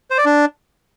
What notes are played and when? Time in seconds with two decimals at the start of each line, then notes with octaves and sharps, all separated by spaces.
0.10 C5
0.18 D5
0.25 D4